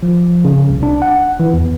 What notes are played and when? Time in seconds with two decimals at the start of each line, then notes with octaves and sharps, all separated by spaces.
0.03 F3
0.45 C#3
0.69 C2
0.83 D4
1.02 F#5
1.40 E3
1.53 E2